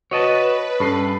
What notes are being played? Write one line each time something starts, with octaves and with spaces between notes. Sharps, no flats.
F#4 B4 C#5 D#5 A5
G2 C#4 A4 C7